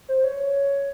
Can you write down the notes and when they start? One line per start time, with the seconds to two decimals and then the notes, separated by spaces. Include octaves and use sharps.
0.09 C5
0.24 C#5